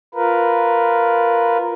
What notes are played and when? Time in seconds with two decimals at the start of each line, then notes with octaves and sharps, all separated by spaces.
0.15 F4 A#4 B4